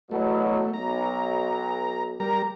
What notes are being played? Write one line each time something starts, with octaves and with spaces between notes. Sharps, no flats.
E2 B2 F#3 A3
B1 A#5
G3 A#4 A#5